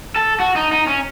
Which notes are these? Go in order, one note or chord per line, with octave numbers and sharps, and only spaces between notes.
A4
F#4
D#4
D#4
C#4